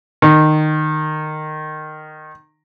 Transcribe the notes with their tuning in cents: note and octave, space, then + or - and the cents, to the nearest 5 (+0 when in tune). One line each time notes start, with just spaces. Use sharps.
D#3 -15